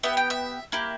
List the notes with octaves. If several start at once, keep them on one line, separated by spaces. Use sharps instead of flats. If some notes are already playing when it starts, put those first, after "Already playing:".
B3 G4 E5
G5
E5
A#3 E4 G4